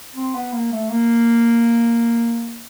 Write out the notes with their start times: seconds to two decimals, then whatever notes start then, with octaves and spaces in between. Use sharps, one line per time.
0.16 C4
0.35 B3
0.53 A#3
0.72 A3
0.90 A#3